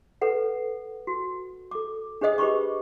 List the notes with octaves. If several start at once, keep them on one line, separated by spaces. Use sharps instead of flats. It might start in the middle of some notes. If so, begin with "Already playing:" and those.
A4 B4 F#5
F#4
A4 D6
D4 G#4 C5 D#5 D#6
G4 B4 C5 B5 C#6 D6